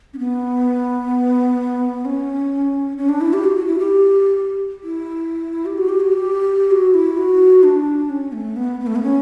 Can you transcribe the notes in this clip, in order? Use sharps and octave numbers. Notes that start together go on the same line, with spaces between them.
C#4
B3
C#4
C#4
D4
E4
G4
F#4
F#4
E4
G4
E4
G4
F#4
G4
F#4
G4
F#4
E4
F#4
D4
C#4
A3
B3
B3
A3
B3
C#4